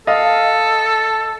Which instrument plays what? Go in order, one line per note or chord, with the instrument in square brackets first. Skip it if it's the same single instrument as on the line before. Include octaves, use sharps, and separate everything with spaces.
[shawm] A4 [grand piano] D#5 F5